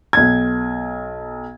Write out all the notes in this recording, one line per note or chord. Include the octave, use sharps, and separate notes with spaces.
B1 G#6